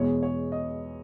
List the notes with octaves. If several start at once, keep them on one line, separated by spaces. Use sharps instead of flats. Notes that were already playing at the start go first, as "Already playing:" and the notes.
Already playing: E2 B2 G#3 C#5
C#5
D#5